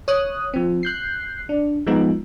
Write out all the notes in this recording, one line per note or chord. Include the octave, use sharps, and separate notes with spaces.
C#5 D#6 F#6
F3 C4
F#6 G6 C7
D4
F3 G#3 B3 D#4